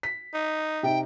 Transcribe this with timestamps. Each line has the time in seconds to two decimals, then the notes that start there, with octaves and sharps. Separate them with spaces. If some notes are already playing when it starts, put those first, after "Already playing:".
0.03 B6
0.34 D#4
0.83 C3 D#4 G5